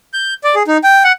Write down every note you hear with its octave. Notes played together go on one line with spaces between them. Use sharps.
G6
D5
G#4
D#4
G5
F#5